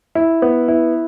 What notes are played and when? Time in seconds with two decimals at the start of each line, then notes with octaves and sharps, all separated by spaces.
0.15 E4
0.42 B3
0.68 E4